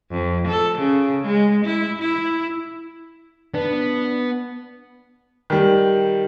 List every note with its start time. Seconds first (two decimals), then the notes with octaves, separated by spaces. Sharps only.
0.11 F2
0.48 A4
0.79 C#3
1.26 G#3
1.65 E4
2.02 E4
3.54 B3 D4
5.50 D#3 G3